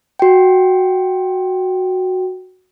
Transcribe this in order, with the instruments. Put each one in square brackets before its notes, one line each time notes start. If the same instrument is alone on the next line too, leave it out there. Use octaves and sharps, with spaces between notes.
[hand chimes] F#4 G5